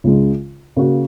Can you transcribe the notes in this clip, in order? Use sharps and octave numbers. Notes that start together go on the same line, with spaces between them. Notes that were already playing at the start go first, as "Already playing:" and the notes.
C#2 C#3 G#3
C#3 A#3 F#4